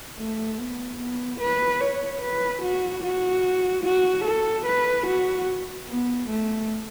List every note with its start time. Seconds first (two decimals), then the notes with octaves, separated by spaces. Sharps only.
0.18 A3
0.58 B3
1.00 B3
1.40 B4
1.80 C#5
2.21 B4
2.62 F#4
3.03 F#4
3.84 F#4
4.25 A4
4.65 B4
5.06 F#4
5.88 B3
6.29 A3